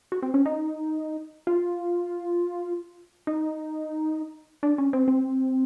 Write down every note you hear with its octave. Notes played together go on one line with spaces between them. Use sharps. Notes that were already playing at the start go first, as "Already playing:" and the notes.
F#4
C4
C#4
D#4
F4
D#4
D4
C#4
C4
C4